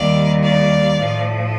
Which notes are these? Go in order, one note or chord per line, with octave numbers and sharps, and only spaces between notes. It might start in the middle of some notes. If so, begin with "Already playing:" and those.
Already playing: D#2 D#3 G3 D5 F5
D5 F5
A2 F3